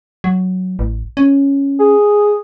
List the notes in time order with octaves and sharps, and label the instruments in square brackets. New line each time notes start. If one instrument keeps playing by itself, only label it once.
[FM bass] F#3
A1
C#4
[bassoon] G#4